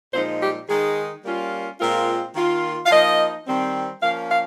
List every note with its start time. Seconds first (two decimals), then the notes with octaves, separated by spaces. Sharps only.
0.14 A#2 F3 G#3 D#4 C5
0.41 G4
0.69 D#3 G#3 D#4 G#4
1.25 G3 A#3 C#4 F4
1.80 A#2 G#3 C4 F4 A#4
2.36 D#3 A#3 F4
2.86 F5
2.91 F3 A#3 D#4 D#5
3.47 D#3 G3 C4
4.02 F3 A#3 C#4 F5
4.30 F5